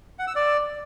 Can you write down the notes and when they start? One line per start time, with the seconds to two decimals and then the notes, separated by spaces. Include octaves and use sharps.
0.19 F#5
0.27 E6
0.36 D5